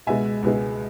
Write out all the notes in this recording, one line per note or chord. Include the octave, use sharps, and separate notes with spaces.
C#2 B2 G#3 E5 G#5
C#2 B2 G#3